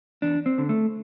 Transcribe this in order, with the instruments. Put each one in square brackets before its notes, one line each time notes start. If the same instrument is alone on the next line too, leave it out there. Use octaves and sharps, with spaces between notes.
[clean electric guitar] E2 D4
C4
D3
A3